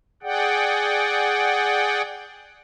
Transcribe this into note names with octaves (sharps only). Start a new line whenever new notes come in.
G#4 D5 F#5 G5